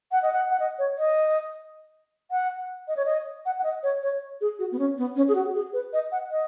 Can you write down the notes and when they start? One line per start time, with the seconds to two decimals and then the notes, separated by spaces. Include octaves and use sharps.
0.12 F#5
0.22 D#5
0.33 F#5
0.51 F#5
0.60 D#5
0.79 C#5
0.98 D#5
2.31 F#5
2.88 D#5
2.97 C#5
3.05 D#5
3.45 F#5
3.59 F#5
3.64 D#5
3.83 C#5
4.02 C#5
4.41 G#4
4.59 F#4
4.72 B3
4.79 C#4
4.98 B3
5.16 C#4
5.28 G#4
5.35 F#4
5.55 G#4
5.73 B4
5.93 D#5
6.12 F#5
6.31 D#5